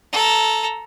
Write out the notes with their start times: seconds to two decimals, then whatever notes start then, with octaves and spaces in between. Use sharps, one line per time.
0.13 A4 A#5